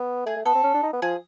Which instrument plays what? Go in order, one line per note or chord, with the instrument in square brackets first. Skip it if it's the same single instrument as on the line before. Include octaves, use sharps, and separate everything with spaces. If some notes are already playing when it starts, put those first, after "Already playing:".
Already playing: [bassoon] B3
[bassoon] A3 [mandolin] G#4
[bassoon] A3
[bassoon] B3 [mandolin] A4
[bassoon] C4
C#4
D4
D#4
B3
[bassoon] F3 [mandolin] G#4